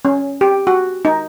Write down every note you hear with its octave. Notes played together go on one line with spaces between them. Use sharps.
C#4
G4
F#4
D#4